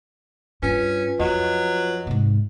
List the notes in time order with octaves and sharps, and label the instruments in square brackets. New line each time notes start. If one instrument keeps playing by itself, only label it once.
[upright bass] G2 [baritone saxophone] C#4 [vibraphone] F4 B4
[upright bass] F2 [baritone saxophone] F#3 [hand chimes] D#5 F#5
[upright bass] G#2 C3